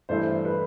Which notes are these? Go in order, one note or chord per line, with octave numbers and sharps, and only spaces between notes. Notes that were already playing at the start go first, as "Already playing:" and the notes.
G2 E3 A3 E4 C5
B4